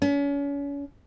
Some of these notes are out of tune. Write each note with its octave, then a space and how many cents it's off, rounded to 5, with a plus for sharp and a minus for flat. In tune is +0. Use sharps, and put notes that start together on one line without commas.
C#4 +35